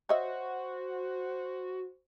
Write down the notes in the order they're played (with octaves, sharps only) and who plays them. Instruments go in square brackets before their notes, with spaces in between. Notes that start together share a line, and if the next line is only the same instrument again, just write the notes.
[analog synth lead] F#4 [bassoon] C5 [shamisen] C#5 D#5 E5